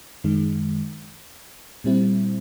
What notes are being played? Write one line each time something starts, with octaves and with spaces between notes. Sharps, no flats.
F#2 D#3 G#3
A#2 G3 C4 E4